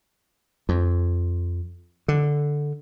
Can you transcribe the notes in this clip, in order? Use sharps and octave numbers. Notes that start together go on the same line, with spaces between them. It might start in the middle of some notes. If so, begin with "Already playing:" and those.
F2
D3